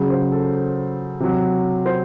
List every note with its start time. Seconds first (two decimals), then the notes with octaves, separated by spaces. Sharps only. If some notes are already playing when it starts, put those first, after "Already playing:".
Already playing: C#3 F#3
0.10 C5
0.32 A4
1.20 C3 F#3
1.86 C5